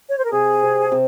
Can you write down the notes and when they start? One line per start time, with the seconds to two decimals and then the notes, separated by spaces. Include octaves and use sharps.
0.09 C#5
0.18 C5
0.25 A#4
0.32 C3 G#4
0.63 C3
0.92 C3